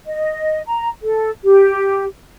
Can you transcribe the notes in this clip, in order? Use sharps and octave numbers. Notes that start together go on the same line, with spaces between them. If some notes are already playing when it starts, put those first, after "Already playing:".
D#5
A#5
A4
G4